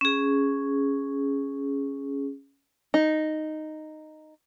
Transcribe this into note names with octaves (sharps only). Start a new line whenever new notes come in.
C#4 G#4
D#4